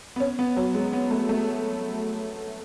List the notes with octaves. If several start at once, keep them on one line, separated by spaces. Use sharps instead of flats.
B3
C#4
B3
F#3
G#3
B3
A3
A3